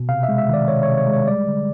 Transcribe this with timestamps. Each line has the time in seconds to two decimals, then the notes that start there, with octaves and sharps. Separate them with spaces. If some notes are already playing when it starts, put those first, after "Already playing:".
Already playing: B2
0.09 C3 F5
0.23 E5
0.29 G#3
0.38 E5
0.49 D#3 D5
0.68 C3 C#5
0.83 C3 C#5
0.98 C#5
1.08 G#3
1.13 C#5
1.27 G3 D5
1.48 D3